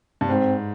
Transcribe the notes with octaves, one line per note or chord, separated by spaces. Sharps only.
G2
G#2 C4